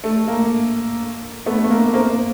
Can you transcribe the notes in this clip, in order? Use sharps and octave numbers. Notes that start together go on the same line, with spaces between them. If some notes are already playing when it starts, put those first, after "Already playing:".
A3
A#3
A3 B3
A3
A#3
A#3 C4